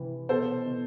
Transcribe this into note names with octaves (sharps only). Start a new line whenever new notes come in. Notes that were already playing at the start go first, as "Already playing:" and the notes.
Already playing: C3 E3
B2 A4 C5
B2